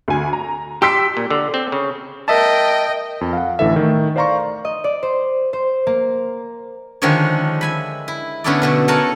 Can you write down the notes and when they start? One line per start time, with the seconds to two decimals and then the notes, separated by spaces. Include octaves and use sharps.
0.08 D2 G#5
0.33 A#5
0.82 G4 C6 E6 B6
1.17 A#2
1.30 D3
1.54 C4
1.72 C#3
2.28 A#4 D#5 E5 G5 A5
3.21 F2
3.33 F5 F#5
3.59 A1 D3 E3 A4 E5
3.76 D#3 A3
4.16 C5 D5 F5 A#5 C6 C#6
4.65 D#5
4.84 D5
5.03 C5
5.53 C5
5.87 A#3
7.02 D3 D#3 F3 G#3 G#4 C#5
7.61 E5 G#5 B5
8.08 E4
8.44 D3 B3 C#4 E4 A4 D5
8.62 B2 D3 A3
8.88 A4 A#4 C#5 F#5 G#5 A5